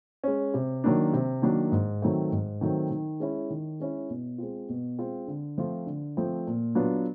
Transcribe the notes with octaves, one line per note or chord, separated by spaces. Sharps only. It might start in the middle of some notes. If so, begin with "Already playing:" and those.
G#3 C#4
C3
D#3 F#3 A#3 D4
C3
D#3 F#3 A#3 D4
G#2
D#3 F#3 A3 C4
G#2
D#3 F#3 A3 C4
D#3
G#3 C#4 E4
D#3
G#3 C#4 E4
B2
G#3 C4 F4
B2
G#3 C4 F4
D3
F3 A3 C4 F4
D3
F3 A3 C4 F4
A#2
F#3 B3 D4 F4